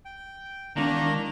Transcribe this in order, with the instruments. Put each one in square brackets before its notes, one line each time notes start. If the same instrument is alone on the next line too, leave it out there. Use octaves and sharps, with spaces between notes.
[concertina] G5
[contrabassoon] E1 [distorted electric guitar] D#3 [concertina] A#3 D4 A#5